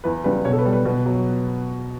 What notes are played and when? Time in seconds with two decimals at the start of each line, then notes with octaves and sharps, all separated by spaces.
0.04 E2 B4
0.24 C#3 E3 G3 B4
0.45 B2 C#5
0.52 A4
0.58 B4
0.65 G3
0.73 B4
0.85 B2
1.06 F#3